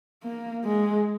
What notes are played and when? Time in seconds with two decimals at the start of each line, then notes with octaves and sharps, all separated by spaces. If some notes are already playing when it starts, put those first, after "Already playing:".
0.23 A#3
0.65 G#3